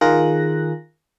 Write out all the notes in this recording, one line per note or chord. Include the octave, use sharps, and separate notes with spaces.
D#3 F4 G#4 A#4 F#6 A#6